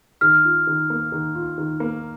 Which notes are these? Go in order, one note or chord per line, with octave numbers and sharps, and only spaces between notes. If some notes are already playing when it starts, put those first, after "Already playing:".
D#3 F6
F4
D#3
A#3
D#3
F4
D#3
A#3